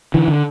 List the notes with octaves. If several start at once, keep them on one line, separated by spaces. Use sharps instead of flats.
D3 E3
D3